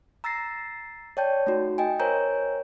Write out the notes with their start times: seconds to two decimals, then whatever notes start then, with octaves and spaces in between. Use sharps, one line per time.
0.24 A#5 E6 A6 A#6 C7
1.17 C#5 D5 G5 A5 G6
1.47 A3 D#4 F#4
1.78 D#5 G5 G#5
2.00 A#4 C5 C#5 G#5 A#5 G6